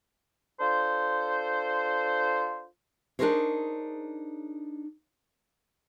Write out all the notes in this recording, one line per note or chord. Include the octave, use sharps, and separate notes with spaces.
D4 F4 A4 C5
D4 D#4 G#4 A#4 C5 C#5